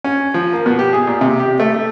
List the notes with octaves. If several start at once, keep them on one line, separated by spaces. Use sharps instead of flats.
C#4
F3
A#3
B2
G4
G#4
A#2
C3
G4
A3
A3